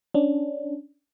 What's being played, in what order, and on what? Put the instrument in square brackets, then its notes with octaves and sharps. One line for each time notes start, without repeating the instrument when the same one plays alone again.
[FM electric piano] C#4 D4